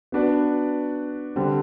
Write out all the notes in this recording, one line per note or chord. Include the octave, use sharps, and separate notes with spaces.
B3 D4 F#4 B4 D5
D3 G3 C4